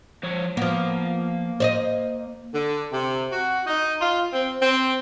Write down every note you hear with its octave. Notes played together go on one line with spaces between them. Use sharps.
F3 C#5
F3 A#3 B3
C5 D5 D#5
D3
C3
F#4
D#4
F4
C4
C4